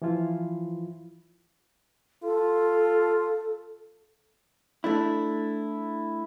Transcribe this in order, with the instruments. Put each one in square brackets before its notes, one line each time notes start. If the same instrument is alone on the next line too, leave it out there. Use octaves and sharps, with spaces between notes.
[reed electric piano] E3 F3 E4 F4
[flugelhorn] F4 [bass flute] A4
[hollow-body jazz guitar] A3 D4 E4